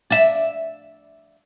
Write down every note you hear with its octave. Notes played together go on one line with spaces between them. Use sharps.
D5 E5